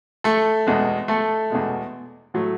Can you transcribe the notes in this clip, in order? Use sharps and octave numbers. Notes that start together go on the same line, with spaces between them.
A3 A4
E2 B2 G#3
A3 A4
E2 B2 G#3
A2 F#3 A3